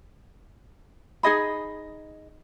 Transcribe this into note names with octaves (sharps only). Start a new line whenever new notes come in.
D#4 G#4 D#5 B5